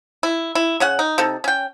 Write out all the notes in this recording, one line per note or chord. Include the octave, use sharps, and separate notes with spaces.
E4
E4
C#3 C#4 F#5
D#4
C3 D#4 A4
C#4 G5